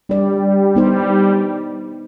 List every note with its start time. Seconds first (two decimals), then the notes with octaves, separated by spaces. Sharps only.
0.09 G3 D4 D5
0.75 B3 D#4 C5